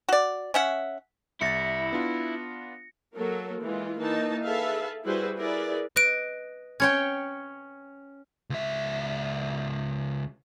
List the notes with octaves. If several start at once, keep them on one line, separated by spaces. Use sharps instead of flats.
F#4 D5
C#4 E5 F#5
C2 E4 E5 A6 A#6 C#7
B3 D4 F4
F#3 A#3 A4 A#4
E3 G#3 F4
E3 A#3 D#4 A5
G#4 A4 B4 E5 F5 A5
G3 E4 F#4 G#4 B4 C5
E4 G#4 A#4 B4 D5
B4 D#5 F#6 D7
C#4 C#5 G5 G#6
C#2 E5